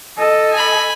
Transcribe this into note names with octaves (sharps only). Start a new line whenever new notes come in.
A4 D#5
G#5 B5